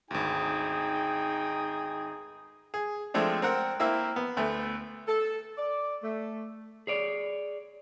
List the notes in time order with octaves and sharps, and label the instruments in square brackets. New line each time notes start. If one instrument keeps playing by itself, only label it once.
[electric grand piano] G#1 D2 [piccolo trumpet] D#4 [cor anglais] G#4 [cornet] G5
[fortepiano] G#4
F3 G#3 A3 C4 D4
C4 A#4 F#5
A#3 C4 E4 E5 E6
B3
D2 A3 B3
[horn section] A4
D5
A3
[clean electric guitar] G#4 C#5 D5